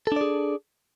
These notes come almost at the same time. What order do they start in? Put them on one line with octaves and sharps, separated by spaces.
A4 D4 D5 G#4